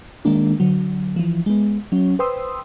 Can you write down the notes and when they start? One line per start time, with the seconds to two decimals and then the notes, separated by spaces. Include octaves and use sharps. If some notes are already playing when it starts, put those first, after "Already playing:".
0.25 D#3 G#3 A#3 D4
0.60 D3 F#3
1.16 E3 F3
1.46 G#3 B3
1.92 F#3 C#4
2.19 B4 C5 G5 C6 D#6 E6